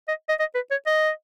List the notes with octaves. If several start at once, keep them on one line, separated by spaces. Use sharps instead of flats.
D#5
D#5
D#5
B4
C#5
D#5